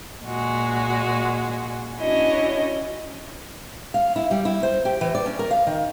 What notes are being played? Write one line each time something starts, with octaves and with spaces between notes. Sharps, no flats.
A#2 G#3 F#4
C#4 D4 E4 F#4 C#5 D#5
F5
E4
G3
E4
C5
G4
E3
D5
C#4
A#4
F5
D#3